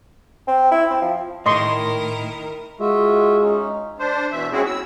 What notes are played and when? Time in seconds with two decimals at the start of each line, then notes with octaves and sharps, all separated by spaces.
0.48 C4
0.71 E4
0.90 C4
1.02 F3
1.46 A2 D#3 E4 A#4 D#5 C6 C#6
2.80 G#3 F4 F#4 E5
3.41 C#4 D#4
3.99 D4 C5
4.32 B2 E3 E5
4.52 G#3 C4 C#4 E4 F#4 G#4
4.66 E6